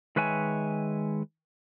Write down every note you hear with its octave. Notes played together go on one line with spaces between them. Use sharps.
D#3 G#3 B4 C#5 E5 G#5